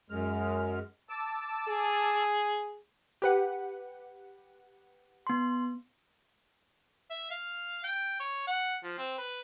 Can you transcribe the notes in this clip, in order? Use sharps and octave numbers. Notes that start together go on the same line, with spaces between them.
F#2 G#3 F6
A5 D6 E6
G#4
G4 B4 F#5
B3 C6
E5
F5
G5
C#5
F#5
F3
C4
B4